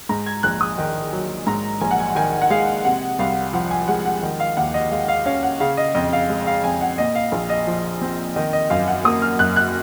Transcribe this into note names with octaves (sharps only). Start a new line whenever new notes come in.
G#2 A#5
G#6
A#1 F#6
D#6
D#3
F#3
G#2 A#5
A#1 G#5
F#5
G#5
D#3 G#5
F#5
G#3 F5
C3 F#5
C2 F5
F3 F#5
G#5
G#3 F#5
F#5
D#3
F5
D#2 F#5
D#5
G#3 F5
F5
C#4 F5
F#5
C#3 F5
D#5
F2 D#5
F5
G#3
F5
F2 G#5
F#5
A#2 D#5
F5
A#1
D#5
F3
C4
D#3 D#5
D#5
F#2 F5
F#5
A#3 D#6
F6
F#2 F#6
F#6